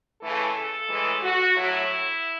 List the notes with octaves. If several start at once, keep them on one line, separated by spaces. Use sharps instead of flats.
C#3 E3 A3 A4
A4
A2 E3 G#3
F#4
A2 F#3 A3 E4